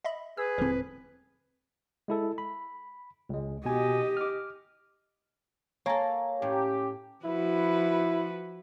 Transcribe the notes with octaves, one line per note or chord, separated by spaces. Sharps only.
D#5 E5 B5
G#4 B4 E6
D#1 A2 D3 F3 C4
G#3 E4 A4
B5
C#2 G#3
B2 G4 D#5 G#5
D6 F6
A#3 A4 C#5 G#5 A#5
A2 C#4 G4
F3 E4 F#4 B4